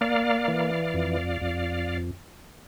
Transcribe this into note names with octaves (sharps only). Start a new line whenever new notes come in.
A#3 D5 F5
E3
F2
F2